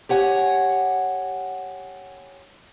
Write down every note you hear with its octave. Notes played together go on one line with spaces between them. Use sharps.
G4 C#5 F#5 G#5